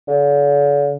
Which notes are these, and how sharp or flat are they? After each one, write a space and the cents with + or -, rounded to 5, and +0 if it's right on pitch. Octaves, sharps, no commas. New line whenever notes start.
D3 -45